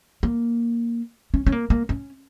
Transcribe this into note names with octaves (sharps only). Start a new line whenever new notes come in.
A#3
C#4
C#4
A#3
A#3
C#4